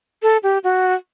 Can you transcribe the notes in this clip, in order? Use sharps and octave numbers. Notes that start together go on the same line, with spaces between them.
A4
G4
F#4